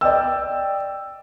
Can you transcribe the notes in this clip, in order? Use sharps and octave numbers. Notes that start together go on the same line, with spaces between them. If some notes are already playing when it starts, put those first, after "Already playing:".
D5 D#5 G5 E6